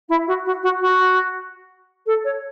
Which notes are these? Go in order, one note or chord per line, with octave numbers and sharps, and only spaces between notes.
E4
F#4
F#4
F#4
F#4
A4
C#5